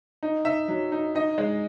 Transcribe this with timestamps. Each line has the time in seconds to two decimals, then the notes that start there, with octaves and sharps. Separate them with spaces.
0.23 D#4
0.45 D#4 E5
0.68 F#3
0.92 D#4
1.15 D#4 D#5
1.38 G#3